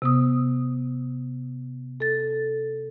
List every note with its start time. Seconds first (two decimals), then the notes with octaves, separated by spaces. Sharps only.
0.02 C3 B3 D#6
2.00 A4 A6